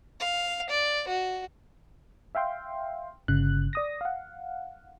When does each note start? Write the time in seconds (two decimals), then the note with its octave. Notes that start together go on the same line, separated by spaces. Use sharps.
0.20 F5
0.70 D5
1.08 F#4
2.35 E5 F5 G5 C6
3.28 G1 C#3 F#6
3.73 D5 D#6 A#6
4.01 F5 F#5